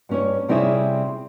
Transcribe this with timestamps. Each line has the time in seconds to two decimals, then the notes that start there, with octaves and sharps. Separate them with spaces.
0.09 G2 C#4 C#5
0.48 C3 G3 C4 C#4 E4 G#4